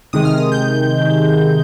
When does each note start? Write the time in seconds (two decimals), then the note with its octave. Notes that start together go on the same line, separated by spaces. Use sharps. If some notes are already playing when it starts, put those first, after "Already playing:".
0.13 C3 D#3 G#3 D#6
0.25 F6
0.38 D#6
0.52 G6